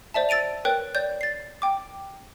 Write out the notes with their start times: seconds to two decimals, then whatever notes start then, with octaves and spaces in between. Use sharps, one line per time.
0.14 C5 D5 E5 A5
0.29 E6 A6 D7 D#7 F7
0.65 A#4 B4 C#5 G5 F#6
0.95 C#5 D5 G6
1.21 A6 C7
1.62 G5 D6